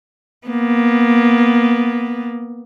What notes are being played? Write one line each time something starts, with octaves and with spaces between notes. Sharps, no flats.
A#3 B3